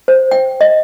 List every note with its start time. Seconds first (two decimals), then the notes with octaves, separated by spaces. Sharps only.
0.08 C5
0.31 G5
0.61 D#5